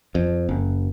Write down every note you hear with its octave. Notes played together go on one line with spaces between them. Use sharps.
F2
F#1